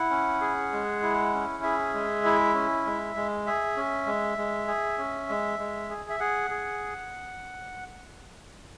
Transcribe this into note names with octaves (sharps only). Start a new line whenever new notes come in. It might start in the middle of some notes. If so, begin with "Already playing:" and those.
Already playing: E4 F#5
C#4
G#4
G#3
E4
C#4
G#4 E5
G#3
E4
C#4
G#3
G#3
G#4 E5
C#4
G#3
G#3
G#4
C#4
G#3
G#3
G#4
E5
G#4 F#5
G#4